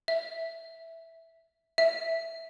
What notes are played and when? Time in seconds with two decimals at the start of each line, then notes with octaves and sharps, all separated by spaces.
0.08 E5
1.78 E5